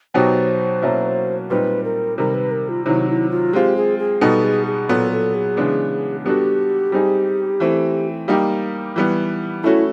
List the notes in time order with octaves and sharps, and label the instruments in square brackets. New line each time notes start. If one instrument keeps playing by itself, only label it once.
[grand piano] B2 F#3 B3 D#4 G4 [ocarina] C5
[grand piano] B2 F#3 A#3 C#4 E4
[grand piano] A#2 G3 C4 D#4 [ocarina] B4
[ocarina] A#4
[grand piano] C3 D#3 G3 [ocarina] A#4
[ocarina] B4
A#4
F4
[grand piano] C3 D#3 F#3 [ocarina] E4
[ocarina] E4
F4
[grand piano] G#3 C4 F4 [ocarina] G4
[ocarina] G#4
G#4
[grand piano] B2 G3 B3 D#4 [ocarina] A4
[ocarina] G#4
G#4
[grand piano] A#2 F#3 B3 [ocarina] A4
[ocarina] A4
G#4
[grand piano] C#3 E3 G#3 B3 D4
[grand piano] G3 B3 D4 F#4 A4 [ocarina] G4
[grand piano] G3 C4 D#4 G#4
E3 A3 C4
G3 A#3 D#4 G4
E3 G3 B3
[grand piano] A3 C#4 F#4 A4 [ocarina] E4